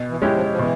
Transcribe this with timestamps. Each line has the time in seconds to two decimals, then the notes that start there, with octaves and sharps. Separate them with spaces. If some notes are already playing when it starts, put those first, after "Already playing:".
Already playing: B2
0.09 E3
0.22 G#3 C#4 E4 G4
0.34 F3
0.50 F3
0.59 B2 E3